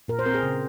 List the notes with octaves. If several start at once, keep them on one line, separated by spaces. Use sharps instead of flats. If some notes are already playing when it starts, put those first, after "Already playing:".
A#2 A#4
C5
C4 A#4
G#4
C#3